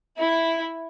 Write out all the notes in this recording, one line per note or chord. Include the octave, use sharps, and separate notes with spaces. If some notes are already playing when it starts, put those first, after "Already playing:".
E4